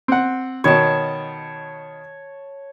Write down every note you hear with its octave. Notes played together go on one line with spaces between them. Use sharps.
C4 F#5
B2 D#3 C#5 A5